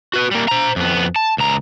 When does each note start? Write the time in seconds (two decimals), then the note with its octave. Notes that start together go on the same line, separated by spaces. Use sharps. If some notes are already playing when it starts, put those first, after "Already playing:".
0.14 F#4 B4
0.31 G3 A#3
0.48 C5 A#5
0.76 F2 B3
1.16 A5
1.38 C#2 A#5